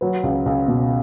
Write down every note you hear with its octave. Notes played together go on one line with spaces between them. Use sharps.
F#3 B4
C#2
C#2
B2